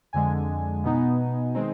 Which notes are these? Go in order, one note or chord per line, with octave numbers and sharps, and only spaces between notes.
F2 D3 G#3 G#5
B2 B3 D#4
D#3 G#3 C4 D#4